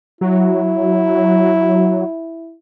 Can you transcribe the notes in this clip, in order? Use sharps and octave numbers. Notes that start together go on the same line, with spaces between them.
F#3 E4